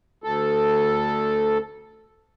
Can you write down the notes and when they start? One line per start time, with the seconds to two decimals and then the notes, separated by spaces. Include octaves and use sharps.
0.24 D2 A4